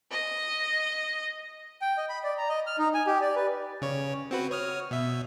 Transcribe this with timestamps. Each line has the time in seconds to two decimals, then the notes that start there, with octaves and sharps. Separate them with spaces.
0.12 D#5
1.82 G5
1.97 D#5
2.09 B5
2.24 D5
2.38 A#5
2.49 D#5
2.67 F6
2.79 D#4
2.94 G#5
3.07 G4
3.21 D5
3.36 B4
3.82 C#3 C#5
4.31 C4 F#4 B4
4.51 C#5 D#6 F6
4.91 B2 E5